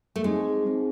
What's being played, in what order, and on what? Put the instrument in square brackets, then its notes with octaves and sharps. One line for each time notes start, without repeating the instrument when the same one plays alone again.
[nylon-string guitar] A3
[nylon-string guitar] G#3 [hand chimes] C4 D#4 G#4
[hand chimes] C4 D#4 G#4